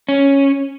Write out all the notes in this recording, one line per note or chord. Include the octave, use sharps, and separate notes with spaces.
C#4